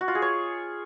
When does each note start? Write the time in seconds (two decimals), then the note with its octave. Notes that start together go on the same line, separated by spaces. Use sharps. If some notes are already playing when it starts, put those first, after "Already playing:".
0.01 F#4
0.08 F4
0.15 G#4
0.22 C#5